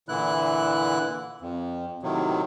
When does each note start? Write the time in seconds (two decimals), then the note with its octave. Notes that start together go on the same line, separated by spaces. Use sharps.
0.09 A#2 D3 E3 E4 F#6
1.41 F2
2.03 A2 C3 D#3 F#3